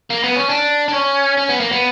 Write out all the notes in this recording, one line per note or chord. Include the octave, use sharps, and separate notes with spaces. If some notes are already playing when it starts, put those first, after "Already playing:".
A#3
B3
C#4
D4
D4
C#4
C#4
B3
A#3
B3